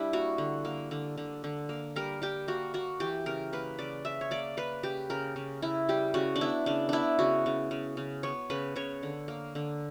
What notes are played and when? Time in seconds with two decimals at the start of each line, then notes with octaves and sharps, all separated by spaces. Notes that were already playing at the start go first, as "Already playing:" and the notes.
Already playing: G3 D4 E4
0.13 A#3 F#4
0.38 D3
0.65 A#3
0.91 D3
1.17 D3
1.44 D3
1.69 A#3
1.96 G3 A#4
2.22 G3 G4
2.48 A#3 F#4
2.74 A#3 F#4
3.00 E3 G4
3.26 C#3 A#4
3.53 A#3 B4
3.79 C#3 D5
4.05 C#3 E5
4.21 C#5
4.31 A#3 D5
4.57 A#3 B4
4.83 C#3 G4
5.10 C#3 A#4
5.36 C#3
5.62 C#3 E4
5.89 G3 G4
6.14 C#3 F#4
6.36 D4
6.41 B3 E4
6.66 C#3 D4
6.89 B3 D4 E4
7.19 C#3 F#4
7.46 C#3
7.71 C#3
7.97 C#3
8.23 B3 C#5
8.50 C#3 B4
8.76 C#3 C#5
9.03 D3
9.28 A#3
9.55 D3